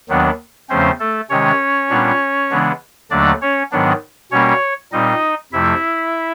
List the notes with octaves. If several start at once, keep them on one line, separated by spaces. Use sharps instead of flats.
D#2 D#3 F#3 B3 D4
E2 C#3 F3 A3 C4 C#4 C5
A3 A4
C3 D#3 G#3 C#4 C#5
A#2 G3 B3 D4
C#3 E3 G#3 B3 D4
D#2 D3 F#3 A3 D4 D5
C#4 C#5
G#2 D#3 F#3 B3 D4
B2 G3 A#3 C#4 C#5
A#2 G3 C4 D#4 D#5
F2 C3 F3 A3 E4 E5